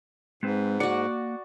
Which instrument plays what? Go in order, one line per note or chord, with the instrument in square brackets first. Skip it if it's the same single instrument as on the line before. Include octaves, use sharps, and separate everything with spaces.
[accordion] G#2 [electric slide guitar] G#3 C4 B4
[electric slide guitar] A#3 F#5 [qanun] F#4 D5